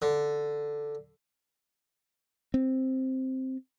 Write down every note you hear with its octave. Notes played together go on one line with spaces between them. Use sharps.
D3
C4